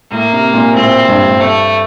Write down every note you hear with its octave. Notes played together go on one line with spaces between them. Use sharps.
A2 A#3
C3
A#2
A2 C4
G2
G2
A3